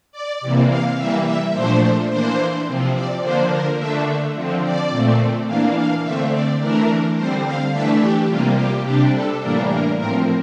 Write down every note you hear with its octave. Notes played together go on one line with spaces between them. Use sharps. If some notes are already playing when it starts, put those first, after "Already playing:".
D5
C3 E3 A#3
F5
E3 G3 A#3 E5
E5
A#2 F3 A3 D4 C5
E3 A#3 D4 C5
C3 F3 C4
D5
D3 F3 A#3 D4 C5
A#4
D3 A3 D4 E5
D3 F3 C4
D5
A#2 A3 C4
E3 A#3 D4 F5
F5
D3 A3 C4 E5
D5
E3 A3 D4 A#4
D3 G3 C4 C5
F5
E3 A3 D4 E5
G4
C3 G3 A#3 F4
G4
C3 G3 D4 G4
A4
A2 E3 G3 A#3 D4 A#4
A#4
A2 F3 C4 A#4